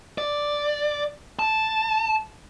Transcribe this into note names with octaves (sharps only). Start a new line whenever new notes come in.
D5
A5